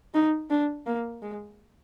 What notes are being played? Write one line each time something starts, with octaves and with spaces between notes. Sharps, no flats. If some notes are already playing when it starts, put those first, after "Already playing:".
D#4
D4
A#3
G#3